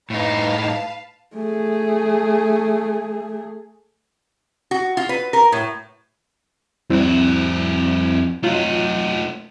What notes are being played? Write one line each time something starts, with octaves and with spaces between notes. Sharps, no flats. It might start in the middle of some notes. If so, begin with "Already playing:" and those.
A2 D#4 B4 F5 A5
A3 G#4
F#4
F4
B4
A#4
A2
F2 G3 C4 E4 F#4
F#3 A3 D#4 F4